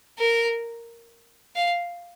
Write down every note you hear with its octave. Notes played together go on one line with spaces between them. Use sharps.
A#4
F5